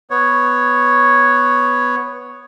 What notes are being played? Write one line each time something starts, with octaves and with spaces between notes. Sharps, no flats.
B3 C#5